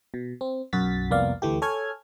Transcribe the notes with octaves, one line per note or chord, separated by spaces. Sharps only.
B2
C4
B1 F#2 F#4 A6 B6
C2 F2 A#3 B3 D5 F5
D2 E3 A3 G4
A4 C#5 G#5 F6 G#6